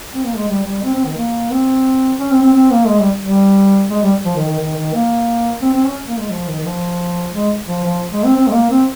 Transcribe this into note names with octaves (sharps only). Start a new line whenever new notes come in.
C4
A#3
G#3
G3
G3
C4
C4
D#3
A#3
C4
C#4
C4
C4
C4
A#3
G#3
G3
G3
G#3
G3
F3
D#3
D#3
D#3
D#3
A#3
C4
C4
C#4
A#3
G#3
F3
D#3
D#3
F3
G#3
F3
F3
G#3
C4
C4
G#3
A#3
C4